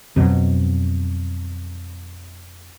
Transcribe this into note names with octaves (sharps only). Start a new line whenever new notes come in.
F2 B2 F#3